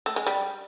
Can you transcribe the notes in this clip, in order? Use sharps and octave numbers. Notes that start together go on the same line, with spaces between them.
A3
G#3
G3